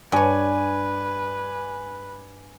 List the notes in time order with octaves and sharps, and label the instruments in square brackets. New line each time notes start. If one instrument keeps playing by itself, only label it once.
[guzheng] G2 C#5 [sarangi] B4 [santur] D5 G#5